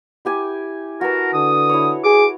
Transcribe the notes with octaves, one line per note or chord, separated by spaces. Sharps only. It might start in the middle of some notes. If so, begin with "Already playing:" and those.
E4 G4 G#5
F#4 A#4 B4 A5
D3 D#6
E4 C#5
G#4 D6